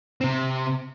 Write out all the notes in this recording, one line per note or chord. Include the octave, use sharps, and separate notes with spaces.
C3 C4